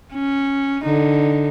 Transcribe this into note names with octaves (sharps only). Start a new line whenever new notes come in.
C#4
D3 D#4